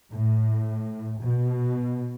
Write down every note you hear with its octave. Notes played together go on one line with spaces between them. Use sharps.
A2
B2